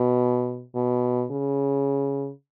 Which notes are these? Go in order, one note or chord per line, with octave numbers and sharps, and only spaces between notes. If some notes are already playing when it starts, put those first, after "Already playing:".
Already playing: B2
B2
C#3